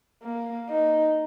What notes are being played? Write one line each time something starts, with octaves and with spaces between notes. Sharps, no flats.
A#3
D#4